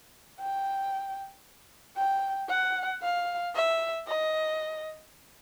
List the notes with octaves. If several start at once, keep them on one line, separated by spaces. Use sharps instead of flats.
G5
G5
F#5
F5
E5
D#5